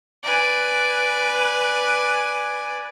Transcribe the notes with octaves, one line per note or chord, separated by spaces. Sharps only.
B4 D5 G#5